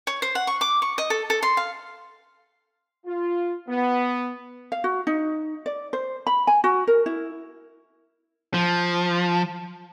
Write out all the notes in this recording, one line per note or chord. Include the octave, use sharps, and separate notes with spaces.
C#5
C5
F#5
C#6
D6
C#6
D#5
A4
A4
C6
F5
F4
B3
F5
F#4
D#4
D5
C5
B5
G#5
F#4
A#4
E4
F3